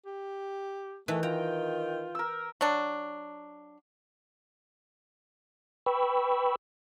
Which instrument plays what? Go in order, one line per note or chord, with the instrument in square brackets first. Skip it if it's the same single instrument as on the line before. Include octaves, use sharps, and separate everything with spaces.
[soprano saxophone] G4
[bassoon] D#3 [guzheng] E3 [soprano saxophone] A3
[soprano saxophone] F4 [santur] G5 [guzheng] A#5
[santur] A#4 E6
[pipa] F#3 D4
[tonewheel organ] B4 G5 B5 C#6 E6